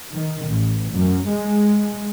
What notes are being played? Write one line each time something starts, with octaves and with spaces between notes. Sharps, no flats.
D#3
A1
F#2
G#3